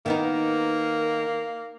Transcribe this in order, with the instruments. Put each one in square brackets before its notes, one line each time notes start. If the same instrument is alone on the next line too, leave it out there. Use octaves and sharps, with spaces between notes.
[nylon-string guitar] D#3 B3 D#4 [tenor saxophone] A#3